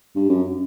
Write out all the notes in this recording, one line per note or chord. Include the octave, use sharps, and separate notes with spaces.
G2
F#2